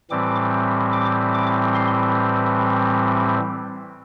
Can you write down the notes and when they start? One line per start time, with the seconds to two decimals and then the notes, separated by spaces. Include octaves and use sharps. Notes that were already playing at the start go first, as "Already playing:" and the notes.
0.11 A2 E3 G3 C4 D6
0.93 D6
1.34 D6
1.75 C6